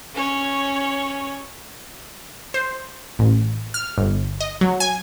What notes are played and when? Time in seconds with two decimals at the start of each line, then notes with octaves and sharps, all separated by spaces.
0.15 C#4 C#5
2.54 C5
3.19 A1
3.74 F6
3.98 G1
4.40 D#5
4.61 F#3
4.80 G#5